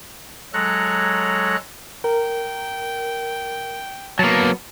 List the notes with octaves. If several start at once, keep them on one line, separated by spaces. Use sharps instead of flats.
F#3 G#3 A4 C#5 A#5 F#6
A#4 G5
F#3 A#3 B3 A5